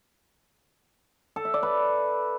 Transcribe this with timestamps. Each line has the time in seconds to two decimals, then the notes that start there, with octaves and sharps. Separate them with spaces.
1.36 A4
1.45 E5
1.54 D5
1.63 B4